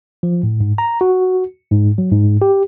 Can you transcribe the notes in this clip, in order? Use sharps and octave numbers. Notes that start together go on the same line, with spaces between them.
F3
A2
G#2
A#5
F#4
G#2
F#3
G#2
G4